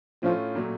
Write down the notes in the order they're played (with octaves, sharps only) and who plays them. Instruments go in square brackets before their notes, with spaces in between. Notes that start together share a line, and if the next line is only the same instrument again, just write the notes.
[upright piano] A2 A3 C#4 F4 [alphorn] F3
[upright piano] A#2 F#3 A3